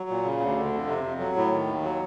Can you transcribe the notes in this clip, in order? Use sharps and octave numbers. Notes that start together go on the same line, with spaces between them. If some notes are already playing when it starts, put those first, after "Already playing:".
Already playing: F#3
A#2
C#3
D2
D3
F2
C3
F2
F#3
A2
D#3
D#2
F#3